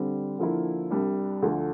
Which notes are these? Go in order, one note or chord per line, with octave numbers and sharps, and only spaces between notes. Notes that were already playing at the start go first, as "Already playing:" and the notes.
Already playing: D3 G3 C4
D3 F3 A#3 E4
C2 C3 G3 D4
D2 D3 F3 A3